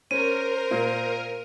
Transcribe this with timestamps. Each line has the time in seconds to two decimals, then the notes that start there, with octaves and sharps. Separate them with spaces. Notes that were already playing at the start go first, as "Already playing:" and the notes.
0.11 C#4 A#4 C5 D#7
0.71 A#2